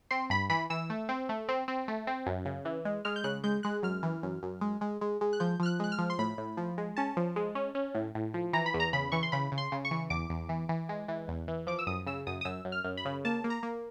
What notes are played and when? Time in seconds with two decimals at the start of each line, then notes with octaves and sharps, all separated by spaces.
0.11 C4 C6
0.30 G2 B5
0.50 E3 B5
0.70 E3 E6
0.90 A3
1.09 C4
1.29 A3
1.49 C4
1.68 C4
1.88 A3
2.07 C4
2.26 F#2
2.46 C#3
2.65 E3
2.85 G#3
3.05 G#3 F6
3.16 G6
3.24 C#3 F#6
3.44 G#3 G6
3.63 G#3 F#6
3.83 F#2 F6
4.03 E3
4.23 F#2
4.43 F#2
4.61 G#3
4.81 G#3
5.01 G#3
5.21 G#3
5.33 F#6
5.40 F3 G6
5.59 F3 F6
5.66 F#6
5.80 G#3 F#6
5.92 F6
5.98 F3
6.10 C6
6.18 A2 B5
6.38 A2
6.57 F3
6.78 G#3
6.97 C#4 A5
7.17 F3
7.36 G#3
7.55 C#4
7.75 C#4
7.94 A2
8.15 A2
8.34 F3
8.53 E3 A#5
8.66 B5
8.74 E2
8.80 A#5
8.93 C#3 B5
9.12 E3 C#6
9.23 C6
9.32 C#3 B5
9.52 C#3
9.58 C6
9.72 C#3
9.85 C#6
9.91 E3
10.10 E2 D6
10.30 E2
10.49 E3
10.69 E3
10.89 G#3
11.08 E3
11.28 E2
11.48 E3
11.67 F3 D6
11.79 E6
11.87 F#2 D#6
12.06 C#3 E6
12.27 F#2 D#6
12.41 D#6
12.45 F#2 E6
12.65 F#2
12.72 F6
12.84 F#2
12.97 B5
13.05 C#3
13.25 A#3 A5
13.44 A#3
13.50 A#5
13.63 A#3